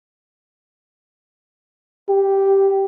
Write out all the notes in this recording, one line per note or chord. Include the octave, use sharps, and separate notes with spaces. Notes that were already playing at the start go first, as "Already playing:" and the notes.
G4